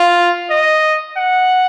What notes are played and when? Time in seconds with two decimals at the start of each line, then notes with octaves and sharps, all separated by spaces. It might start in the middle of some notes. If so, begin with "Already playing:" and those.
Already playing: F4
0.51 D#5
1.17 F#5